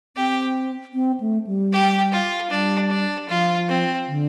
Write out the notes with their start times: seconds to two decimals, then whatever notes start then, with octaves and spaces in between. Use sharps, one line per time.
0.16 C4 G4
0.94 C4
1.20 A3
1.47 G3
1.72 G4
2.12 F4
2.50 G3 D4
2.90 D4
3.29 F3 F4
3.68 C4
4.08 D3